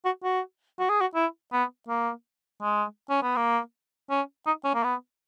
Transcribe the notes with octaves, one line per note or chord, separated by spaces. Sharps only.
F#4
F#4
F#4
G#4
F#4
E4
B3
A#3
G#3
C#4
B3
A#3
C#4
D#4
C#4
A#3
B3